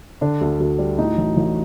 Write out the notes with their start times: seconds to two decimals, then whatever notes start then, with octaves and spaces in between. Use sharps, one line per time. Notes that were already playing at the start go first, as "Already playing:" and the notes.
0.21 D3 D4
0.41 D2
0.60 D2
0.79 G3
0.98 A2 D#4
1.18 A1
1.37 A1